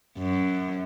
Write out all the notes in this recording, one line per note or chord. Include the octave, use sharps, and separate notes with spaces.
F#2